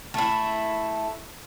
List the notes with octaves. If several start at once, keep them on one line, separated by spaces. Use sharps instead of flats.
A3 E4